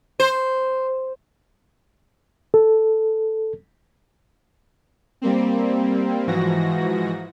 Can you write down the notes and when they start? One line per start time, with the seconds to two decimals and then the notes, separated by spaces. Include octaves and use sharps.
0.20 C5
2.54 A4
5.22 G3 A#3 C4
6.26 G#2 E3 F3 F#4 A#6